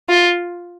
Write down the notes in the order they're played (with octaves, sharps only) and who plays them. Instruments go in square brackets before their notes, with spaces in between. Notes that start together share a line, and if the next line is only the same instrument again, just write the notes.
[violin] F4